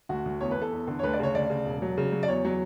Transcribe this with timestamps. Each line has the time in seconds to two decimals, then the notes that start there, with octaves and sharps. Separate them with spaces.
0.09 D2 F#4
0.25 D2
0.41 E2 C#5
0.51 B4
0.56 E2
0.62 A4
0.72 E2
0.87 D3
0.99 C#5
1.03 D2 B4
1.13 D5
1.19 C#3 C#5
1.34 D2 D5
1.50 C#3
1.65 E1
1.82 F#3
1.98 C#3
2.12 F#3
2.23 D5
2.28 E2 C#5
2.45 F#3